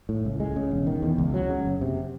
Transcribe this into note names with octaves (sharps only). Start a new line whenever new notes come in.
A2
C#2
G#3
C#3
E1
D#3
E2
C#2
F#3
C#3
F#1
C3